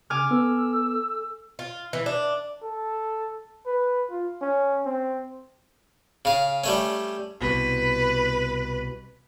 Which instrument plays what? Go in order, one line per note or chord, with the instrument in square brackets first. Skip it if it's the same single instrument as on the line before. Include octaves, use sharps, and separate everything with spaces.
[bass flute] C#3 [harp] G#5 D6 F6
[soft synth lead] B3 [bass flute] A4 [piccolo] E6
[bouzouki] F4
E3
D4
[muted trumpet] A4
B4
F4
C#4
C4
[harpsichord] C#3 F5
G3 A3 C#4
[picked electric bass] C2 B2 [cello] B4